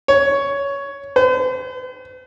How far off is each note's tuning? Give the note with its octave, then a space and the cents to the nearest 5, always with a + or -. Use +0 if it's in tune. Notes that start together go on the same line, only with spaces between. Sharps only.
C#5 +10
C5 -45